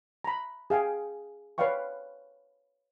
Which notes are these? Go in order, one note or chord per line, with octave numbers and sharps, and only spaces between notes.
A#5 B5
G#4 F5 G5 G#5
B4 C#5 D5 F5 G5 C#6